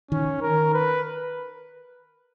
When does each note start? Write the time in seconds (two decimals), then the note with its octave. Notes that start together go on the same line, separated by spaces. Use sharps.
0.11 D#3 C#4
0.42 A#4
0.74 B4